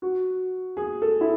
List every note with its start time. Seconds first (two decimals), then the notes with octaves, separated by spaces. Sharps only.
0.02 F#4
0.77 G#4
1.02 A4
1.21 E4